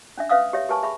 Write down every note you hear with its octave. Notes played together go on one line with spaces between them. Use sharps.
C#4 D4 E5
C#4 B4 E5 F5 D#6 E6
G4 C#5 E5
G4 A#4 B4 G#5 A5 C#6
G#4 E5 B5 C#6